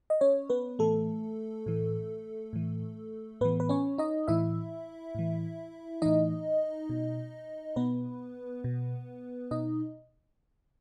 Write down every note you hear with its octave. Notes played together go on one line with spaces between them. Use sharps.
D#5
C#4 C#5
B3 B4
A2 E3 A3 A4
A2 E3
A2 E3
A2 E3 B3 B4
B4
C#4 C#5
D#4 D#5
A2 E3 E4 E5
A2 E3
A2 E3 D#4 D#5
B2
B2 B3 B4
B2
B2 D#4 D#5